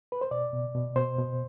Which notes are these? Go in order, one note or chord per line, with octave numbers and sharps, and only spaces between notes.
B4
C5
B2 D5
B2
B2
B2 C5
B2